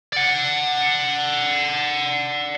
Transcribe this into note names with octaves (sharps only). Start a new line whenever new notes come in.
D5 F#5